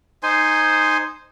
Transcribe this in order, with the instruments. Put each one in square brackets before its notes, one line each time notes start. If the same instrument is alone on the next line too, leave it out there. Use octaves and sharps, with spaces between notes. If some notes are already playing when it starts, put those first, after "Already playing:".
[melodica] D#4 C5 G#5 C6